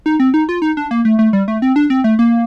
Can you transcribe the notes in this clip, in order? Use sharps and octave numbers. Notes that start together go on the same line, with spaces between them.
D#4
C4
D#4
F4
D#4
D4
A#3
A3
A3
G3
A3
C4
D4
C4
A3
A#3